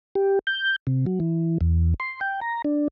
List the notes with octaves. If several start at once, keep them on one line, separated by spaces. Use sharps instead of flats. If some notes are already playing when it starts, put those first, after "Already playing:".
G4
G6
C3
F#3
E3
E2
C6
G5
A#5
D4